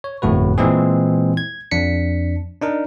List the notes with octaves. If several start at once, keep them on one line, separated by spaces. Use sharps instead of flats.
C#5
G1 F2 A2 F#4 B4
A#2 E3 G#3 C4 G#4
G#6
F2 D4 B6 C#7
D4 D#4 A#4